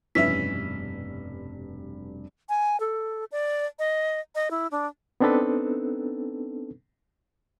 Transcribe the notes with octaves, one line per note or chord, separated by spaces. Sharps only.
F1 G2 B2 E3 C#4 E5 B6
G#5
A4
D5
D#5
D#5
E4
D4
B3 C4 D4 D#4 A4 B4